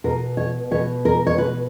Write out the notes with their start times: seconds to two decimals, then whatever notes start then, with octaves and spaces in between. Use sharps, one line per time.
0.04 B2 A#4
0.37 C#5
0.71 B2 C#5
1.05 A#4
1.27 C#5
1.38 B2 B4